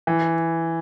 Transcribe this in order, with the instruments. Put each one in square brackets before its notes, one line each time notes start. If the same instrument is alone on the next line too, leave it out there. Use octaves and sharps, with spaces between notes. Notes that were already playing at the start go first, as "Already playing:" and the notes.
[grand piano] E3